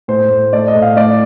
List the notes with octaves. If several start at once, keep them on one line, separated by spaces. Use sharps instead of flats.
A2 C5
A2
A3 D5
D#5
A2
F5
A3 D5